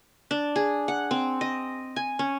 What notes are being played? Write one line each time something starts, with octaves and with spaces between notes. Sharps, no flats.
D4
G#4
F#5
C4
D#5
G#5
C#4